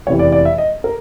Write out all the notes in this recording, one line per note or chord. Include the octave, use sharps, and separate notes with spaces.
F1 E2 C3 E3 C#5
D5
D5
E5
D#5
A#4